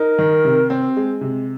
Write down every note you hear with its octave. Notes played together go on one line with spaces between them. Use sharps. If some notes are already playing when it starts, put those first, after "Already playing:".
Already playing: D#4 A#4
D#3
C3
C4
G#3
C3